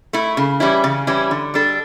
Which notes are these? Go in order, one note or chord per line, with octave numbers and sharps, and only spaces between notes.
A3 E4
C#3
E3 G3 C#4 E4
C#3
E3 G3 C#4 E4
D3
G3 D4 A4